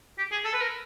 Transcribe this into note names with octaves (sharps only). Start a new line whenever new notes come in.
G4
G#4
A4
B4
A#4